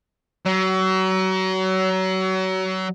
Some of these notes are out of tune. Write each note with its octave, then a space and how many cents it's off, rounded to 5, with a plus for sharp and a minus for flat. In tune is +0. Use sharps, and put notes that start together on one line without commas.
F#3 +30